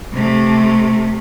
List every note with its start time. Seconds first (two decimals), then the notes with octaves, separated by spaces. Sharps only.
0.12 C3 A3